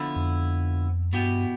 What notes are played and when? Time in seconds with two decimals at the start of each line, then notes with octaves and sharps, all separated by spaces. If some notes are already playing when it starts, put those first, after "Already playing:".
Already playing: D3 F3 B3 E4
0.16 F2
1.13 G2 B2 B3 E4 G4